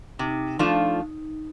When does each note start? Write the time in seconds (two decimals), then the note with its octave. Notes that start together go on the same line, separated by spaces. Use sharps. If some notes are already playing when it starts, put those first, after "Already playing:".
0.19 C3 D#4
0.59 F3 A3 D4 F4